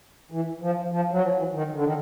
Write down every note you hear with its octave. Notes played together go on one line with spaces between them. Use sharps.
E3
F3
F3
F#3
F3
E3
D#3
D3
D#3